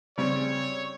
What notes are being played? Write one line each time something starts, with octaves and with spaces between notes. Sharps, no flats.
C#3 G3 C4 C#5